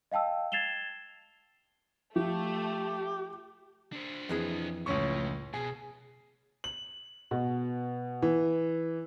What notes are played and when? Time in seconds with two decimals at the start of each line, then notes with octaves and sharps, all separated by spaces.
0.12 D#5 F5 G5 A5 E6
0.52 G#6 A6 C7 E7 F7 G7
2.16 F3 A3 G4
3.92 D4 C5
4.29 F2 E3 G#4
4.86 C#2 A2 C#4 C#6
5.54 B2 G#4
6.64 F#7
7.31 B2
8.22 E3